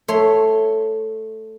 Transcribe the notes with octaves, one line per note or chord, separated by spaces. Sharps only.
A3 C#5 C6